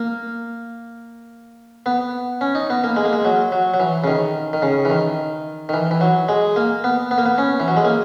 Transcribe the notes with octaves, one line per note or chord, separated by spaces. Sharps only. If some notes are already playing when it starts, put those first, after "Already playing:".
Already playing: A#3
B3
C#4
D#4
B3
A#3
G#3
A#3
G#3
F#3
F#3
F#3
E3
C#3
D#3
D#3
C#3
E3
D#3
D#3
E3
E3
F#3
G#3
A#3
B3
B3
A#3
B3
C#4
E3
F#3
G#3
A#3